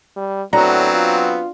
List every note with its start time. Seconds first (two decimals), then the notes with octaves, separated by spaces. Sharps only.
0.16 G3
0.53 A2 F#3 B3 C4 D4 F#4 A#5
0.94 F4